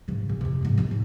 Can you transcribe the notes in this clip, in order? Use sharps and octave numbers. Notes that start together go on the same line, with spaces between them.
G#1 C#3
A#2
F2 C3
E2 G#2
D#2 D#4
A2